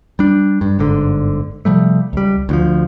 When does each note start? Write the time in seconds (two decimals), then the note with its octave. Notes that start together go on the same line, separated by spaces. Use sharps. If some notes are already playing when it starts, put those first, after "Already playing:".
0.19 G3 D4
0.61 G2
0.79 G1 G#2 D3
1.65 C3 F3 G3 A3
2.13 C#2 G3
2.49 D2 E3 F3